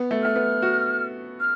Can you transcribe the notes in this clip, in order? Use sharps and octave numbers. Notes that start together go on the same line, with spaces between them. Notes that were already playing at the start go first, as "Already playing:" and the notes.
Already playing: B3
A3
A3 F6
B3
F#4
F6